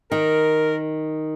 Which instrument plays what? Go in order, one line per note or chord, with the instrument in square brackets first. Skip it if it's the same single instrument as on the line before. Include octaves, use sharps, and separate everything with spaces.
[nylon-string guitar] D#3 [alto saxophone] A#4